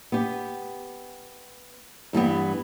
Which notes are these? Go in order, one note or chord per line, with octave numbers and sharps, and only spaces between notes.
B3 G4
G2 E3 G3 B3